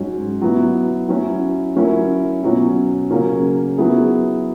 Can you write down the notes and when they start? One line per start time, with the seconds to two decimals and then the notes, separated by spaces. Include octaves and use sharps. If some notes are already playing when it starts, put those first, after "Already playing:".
Already playing: G#2 F#3 C#4
0.41 F#3 B3 E4
1.08 F#3 C#4 E4
1.76 F#3 C#4 E4 A#4
2.43 B2 F#3 C#4
3.11 C#3 F#3 A#3 C#4
3.78 F#3 B3 E4 G#4